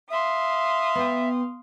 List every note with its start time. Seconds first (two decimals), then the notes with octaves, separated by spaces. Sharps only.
0.10 E5 F5 C6 D#6
0.95 B3 G5